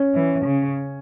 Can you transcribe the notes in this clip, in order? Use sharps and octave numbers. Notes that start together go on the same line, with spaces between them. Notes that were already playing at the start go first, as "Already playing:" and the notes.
Already playing: C#4
E3
C#3